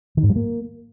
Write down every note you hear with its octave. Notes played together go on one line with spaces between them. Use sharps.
D#3
G#2
G3
A#3